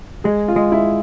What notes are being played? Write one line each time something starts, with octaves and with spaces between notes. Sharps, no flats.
G#3 G#4
F4
G#3
E4